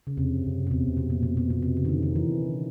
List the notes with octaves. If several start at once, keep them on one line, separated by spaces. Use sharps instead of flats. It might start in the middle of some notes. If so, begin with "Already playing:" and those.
C#3
E2 C3
F2
F2
F#2
C3
E2 B2
E2
B2
F2 A#2
B2
B2
B2
C3
C#3
D#3
D3
D#3
E3